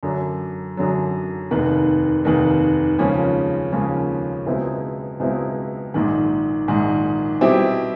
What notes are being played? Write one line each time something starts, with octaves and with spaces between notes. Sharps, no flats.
F#2 D3 F#3
F#2 D3 F#3
F1 D#2 D#3
F1 D#2 D#3
D#2 C#3 F3 G#3 C#4
D#2 C#3 F3 G#3 C#4
C#2 B2 G#3 C4 E4
C#2 B2 G#3 C4 E4
A#1 G#2 D#3
A#1 G#2 D#3
B2 G3 C4 E4 G4